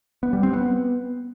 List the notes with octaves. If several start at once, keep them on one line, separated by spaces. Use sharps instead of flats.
B3
G3
C4
B3